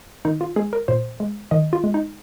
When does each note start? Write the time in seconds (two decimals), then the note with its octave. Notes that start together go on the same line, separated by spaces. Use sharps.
0.25 D#3 D#4
0.41 F4
0.56 G#3 G#4
0.73 A#4
0.88 A#2 C5
1.20 G#3
1.51 D#3 D#5
1.73 F4
1.84 G#3
1.94 D#4